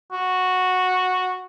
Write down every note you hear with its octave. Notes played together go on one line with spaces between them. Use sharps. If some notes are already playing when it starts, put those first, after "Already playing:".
F#4